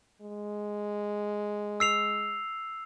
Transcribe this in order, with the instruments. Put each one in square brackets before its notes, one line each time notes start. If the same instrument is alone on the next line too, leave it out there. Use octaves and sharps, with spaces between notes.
[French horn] G#3
[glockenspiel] E6 C7 F7